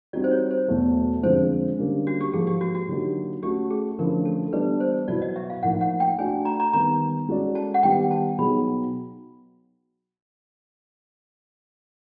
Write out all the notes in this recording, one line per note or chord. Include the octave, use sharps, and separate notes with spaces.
G3 C4 D#4 F#4 D5
C5
C#5
C5
E2 B2 F#3 A3
F2 D3 F3 G#3 C5
D3 G3 A#3 C#4
F#4
G4
G#2 F3 A#3 G#4
G4
F#4
F#4
D3 F#3 A#3 D#4 G4
A3 C#4 F#4 G4
G#4
D3 F3 A3 C#4 E4 A#4
A4
E3 G3 B3 D4 G4 B4
C5
B2 F#3 B3 E4 D5
D#5
E5
F5
A2 F3 A#3 D#4 F#5
F#5
G5
A3 D4 F#4 G#5
A#5
A#5
D#3 G3 B3 A#5
G#3 C#4 F#4 A4 D5
A5
F#5
D#3 G3 B3 G5
A5
B2 F#3 B3 D#4 G#4 B5